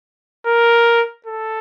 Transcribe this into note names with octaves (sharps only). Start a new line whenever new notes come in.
A#4
A4